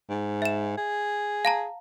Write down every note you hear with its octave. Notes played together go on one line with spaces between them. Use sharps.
G#2
E5 E7
G#4
F5 A5 A#5